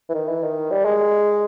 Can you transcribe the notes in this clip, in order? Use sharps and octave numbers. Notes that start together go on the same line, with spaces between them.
E3
D#3
E3
D#3
G3
G#3